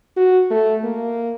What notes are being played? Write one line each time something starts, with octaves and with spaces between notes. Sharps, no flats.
F#4
A3
A#3